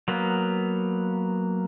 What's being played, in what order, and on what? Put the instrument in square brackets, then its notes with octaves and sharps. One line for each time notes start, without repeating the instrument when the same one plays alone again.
[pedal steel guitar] F#3 A#3 B3